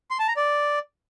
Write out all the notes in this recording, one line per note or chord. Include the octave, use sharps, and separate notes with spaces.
C6
A5
A#5
D5